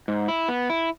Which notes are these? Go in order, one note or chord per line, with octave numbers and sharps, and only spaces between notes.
G#2
E4
B3
E4